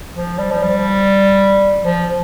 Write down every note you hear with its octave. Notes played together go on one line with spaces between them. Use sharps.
F3
G3
F3
G3
F3